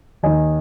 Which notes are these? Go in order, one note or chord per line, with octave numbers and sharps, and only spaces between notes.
D#2 D#3 D#5 G#5